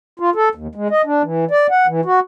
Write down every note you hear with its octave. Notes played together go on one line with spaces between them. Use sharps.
F4
A4
D#2
G#3
D#5
D4
E3
D5
F#5
E3
F#4